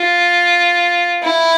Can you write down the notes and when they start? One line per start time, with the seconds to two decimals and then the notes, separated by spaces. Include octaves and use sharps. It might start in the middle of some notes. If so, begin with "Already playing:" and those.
Already playing: F4
1.23 E4